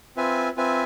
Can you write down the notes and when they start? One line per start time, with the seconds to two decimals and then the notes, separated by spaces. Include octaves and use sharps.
0.17 C4 F4 B4 E5 G#5
0.57 C4 F4 B4 E5 G#5